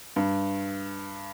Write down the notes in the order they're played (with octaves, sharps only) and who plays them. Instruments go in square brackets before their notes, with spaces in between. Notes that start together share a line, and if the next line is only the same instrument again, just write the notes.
[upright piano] G2